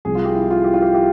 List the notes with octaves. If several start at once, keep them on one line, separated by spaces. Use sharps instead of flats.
C2 C3 F3 G#4
F4
G4
E4
F4
G4
F4
G4
G4